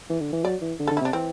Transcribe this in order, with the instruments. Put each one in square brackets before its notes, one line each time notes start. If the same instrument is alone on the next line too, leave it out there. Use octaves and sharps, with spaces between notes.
[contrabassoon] E3
D3
E3
[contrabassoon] F#3 [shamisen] D5
[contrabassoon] E3
D3
[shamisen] A4
[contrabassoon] D3
[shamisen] E4
[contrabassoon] C3
[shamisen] D4
[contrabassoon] E3 [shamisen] C4